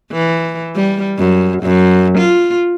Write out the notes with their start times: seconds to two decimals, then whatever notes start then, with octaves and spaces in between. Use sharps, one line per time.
0.12 E3
0.75 G3
1.18 F#2
1.63 F#2
2.18 F4